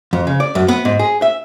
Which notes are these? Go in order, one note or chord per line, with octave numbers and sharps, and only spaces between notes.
F2
C#3
D5
F#2
B3
G#2
G#4
E5